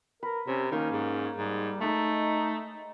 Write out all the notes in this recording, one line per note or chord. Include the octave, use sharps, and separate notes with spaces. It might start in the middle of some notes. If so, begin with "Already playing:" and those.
A#4 B4
C3 C#4 C#5
D#3 A#3 C#4 C#5
G#2
G#2 G3
G#3 A3 D#4 A#5 B5